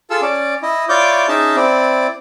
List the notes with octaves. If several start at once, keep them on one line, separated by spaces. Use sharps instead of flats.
F4 G#4 A4 E6
C#4 D5
E4 D#5
E4 F4 C#5 D5 D6 G6
C#4 D#4 G#4 D#5 E5 A5
C4 E4 D5